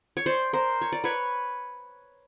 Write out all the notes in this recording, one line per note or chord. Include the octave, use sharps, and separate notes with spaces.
C#5
C5 D5
A#4 C5
C#5
D5
B4 C#5